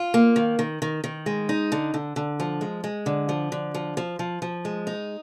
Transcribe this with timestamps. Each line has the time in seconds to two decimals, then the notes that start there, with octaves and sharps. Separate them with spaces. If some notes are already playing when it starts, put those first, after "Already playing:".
Already playing: F4
0.14 A#3
0.36 D#3
0.59 D#3
0.82 D#3
1.04 D#3
1.26 G#3
1.49 D#4
1.72 D3
1.94 D3
2.16 D3
2.40 F3
2.61 G#3
2.84 G#3
3.06 D3
3.29 F3
3.52 D3
3.74 F3
3.97 F3
4.19 F3
4.42 F3
4.65 G#3
4.87 D#4